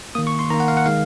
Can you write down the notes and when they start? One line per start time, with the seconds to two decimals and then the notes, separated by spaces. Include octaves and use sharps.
0.15 D#3 A#3 D#6
0.27 C#6
0.39 C6
0.50 D#3 A#5
0.54 A#3
0.60 F#5
0.68 F5
0.77 F#5
0.86 D#3 G#3 F5